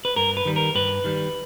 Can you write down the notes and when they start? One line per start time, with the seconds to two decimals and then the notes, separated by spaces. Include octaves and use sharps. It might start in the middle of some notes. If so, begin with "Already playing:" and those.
0.05 B4
0.16 G2 A#4
0.37 B4
0.45 D#3 G3
0.56 A#4
0.75 G2 B4
1.04 D#3 G3